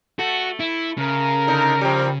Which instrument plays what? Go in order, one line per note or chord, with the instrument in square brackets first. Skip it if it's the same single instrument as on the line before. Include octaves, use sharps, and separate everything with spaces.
[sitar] A3 [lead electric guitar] F#4
[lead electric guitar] E4
[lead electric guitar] C#3 [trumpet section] A#4
[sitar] D3 D#4
F3 G3